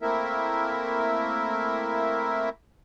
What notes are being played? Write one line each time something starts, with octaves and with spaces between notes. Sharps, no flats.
A3 A#3 C4 E4 A#4 E5